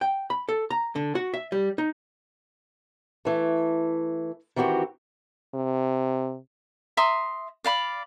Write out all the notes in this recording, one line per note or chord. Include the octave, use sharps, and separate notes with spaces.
G5
B5
A4
A#5
D3
F#4
E5
G3
D#4
E3 A3
D#3 E3 C4 F#4 G4
C3
E5 A#5 C6 D#6
D5 F5 B5